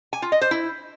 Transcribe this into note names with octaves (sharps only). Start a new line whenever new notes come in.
G#5
F4
D#5
C5
E4